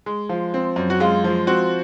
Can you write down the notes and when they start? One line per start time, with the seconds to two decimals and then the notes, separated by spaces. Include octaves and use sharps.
0.06 G#3
0.29 F3
0.54 C4
0.76 F#2
0.90 F#4
1.00 G#3 F4
1.24 F3
1.47 C4 F#4